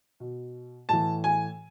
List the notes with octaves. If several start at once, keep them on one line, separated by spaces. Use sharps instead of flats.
B2
A2 E3 A5
G#5